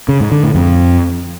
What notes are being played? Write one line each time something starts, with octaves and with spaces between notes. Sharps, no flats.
C#3
G#2
D3
A2
F2